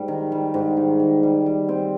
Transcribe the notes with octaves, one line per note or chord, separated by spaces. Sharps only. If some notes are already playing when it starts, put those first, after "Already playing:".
Already playing: G#2 G3
D#3
G3
G#2
D#3
D#3
G3
G3
C4